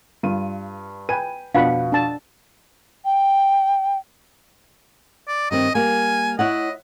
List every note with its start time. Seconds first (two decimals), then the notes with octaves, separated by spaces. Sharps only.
0.23 G2 F4 D#7
1.09 B4 G5 G#5 D#7
1.55 F2 B2 D4 F5 F#5 B5
1.92 D4 A5
3.04 G5
5.28 D5
5.51 G2 D#3 C4 D#5
5.75 G3 A#3 G#5
6.39 E4 C#5 D#5 F#5